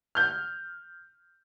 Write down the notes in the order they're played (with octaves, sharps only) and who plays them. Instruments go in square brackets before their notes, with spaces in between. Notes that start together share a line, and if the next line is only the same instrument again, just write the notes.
[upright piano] F6 G6